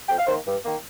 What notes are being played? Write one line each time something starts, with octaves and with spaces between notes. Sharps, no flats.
F2 G5
F5
D#3 A#3 C5
G2
D#3 A#3